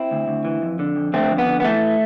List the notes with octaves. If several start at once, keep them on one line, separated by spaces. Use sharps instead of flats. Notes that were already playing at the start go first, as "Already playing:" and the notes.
Already playing: C4 E4
D2
D2
E3
F2
D3
F2
D3 A3 C4
F2
B3
D3
B3
E3 A3